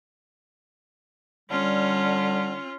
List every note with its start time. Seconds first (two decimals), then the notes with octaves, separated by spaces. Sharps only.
1.50 D3 G3 C#4 F4